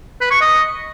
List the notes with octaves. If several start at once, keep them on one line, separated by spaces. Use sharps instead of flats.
B4
C#6
D#5